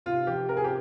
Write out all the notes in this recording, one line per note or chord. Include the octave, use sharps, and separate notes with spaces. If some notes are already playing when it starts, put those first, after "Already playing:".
C3 F4
F3 G4
C4 A#4
G#4
G4